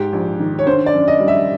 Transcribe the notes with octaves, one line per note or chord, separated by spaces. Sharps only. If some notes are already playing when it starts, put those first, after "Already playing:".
Already playing: G#2 G4
A#1
D#3
C#5
D3 C5
D5
F#2
D#5
G3
E5